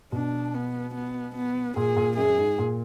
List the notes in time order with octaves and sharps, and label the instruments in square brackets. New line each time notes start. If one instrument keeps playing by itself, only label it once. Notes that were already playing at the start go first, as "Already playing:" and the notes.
[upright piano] B2 [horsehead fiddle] D4
[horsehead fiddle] B3
B3
B3
[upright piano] A#2 [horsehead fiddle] G#4
[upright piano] A#2
[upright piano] F#2 [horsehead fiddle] G#4
[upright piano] G#2
A#2